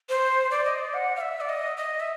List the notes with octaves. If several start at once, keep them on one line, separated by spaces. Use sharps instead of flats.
C5
D5
D#5
D5
F#5
F5
E5
D5
D#5
D#5
E5